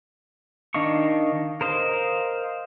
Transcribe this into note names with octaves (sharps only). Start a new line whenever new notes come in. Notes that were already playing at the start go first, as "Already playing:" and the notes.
D#3 D4 D#5 F5 C#6
A#4 C5 D#5 F5